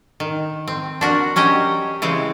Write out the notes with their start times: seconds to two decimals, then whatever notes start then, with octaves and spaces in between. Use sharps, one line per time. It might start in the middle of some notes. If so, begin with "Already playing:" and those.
0.20 D#3
0.68 C4
1.01 D4 F#4 A#4
1.36 F#3 C#4 G4 D#5
2.02 C#3 E3 G#3 C4